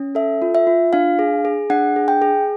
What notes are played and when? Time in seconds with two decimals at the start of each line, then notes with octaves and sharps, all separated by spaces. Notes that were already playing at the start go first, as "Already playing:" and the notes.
Already playing: C#4
0.15 A4 E5
0.42 F4
0.55 E5
0.67 F4
0.93 D4 F5
1.19 G#4
1.45 G#4
1.70 D4 F#5
1.96 G#4
2.08 G5
2.22 G#4